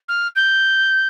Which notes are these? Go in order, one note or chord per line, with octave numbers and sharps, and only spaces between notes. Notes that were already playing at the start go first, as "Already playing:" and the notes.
F6
G6